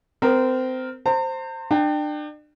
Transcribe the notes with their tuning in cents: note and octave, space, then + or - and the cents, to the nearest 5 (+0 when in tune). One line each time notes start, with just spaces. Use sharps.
C4 -25 A#4 +0
C5 +0 A#5 -45
D4 +35 G5 +5